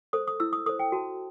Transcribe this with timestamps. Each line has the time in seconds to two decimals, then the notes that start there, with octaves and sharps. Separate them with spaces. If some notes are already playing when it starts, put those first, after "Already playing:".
0.13 A4 C5 D#6
0.27 D#6
0.40 E4 E6
0.53 D#6
0.66 A4 C5 D#6
0.79 G5
0.92 F#4 A5